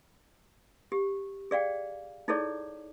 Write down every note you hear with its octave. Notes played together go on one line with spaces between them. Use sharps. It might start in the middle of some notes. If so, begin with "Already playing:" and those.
G4
G#4 D5 F5 G5
D#4 E4 G#4 A4 C#5 D5